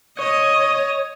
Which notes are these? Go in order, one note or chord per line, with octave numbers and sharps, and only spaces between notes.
C#5 D#5